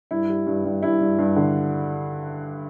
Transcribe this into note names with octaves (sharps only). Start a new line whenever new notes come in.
G2 E4
G3
G2
G2
G2 E4
G2
G2
D3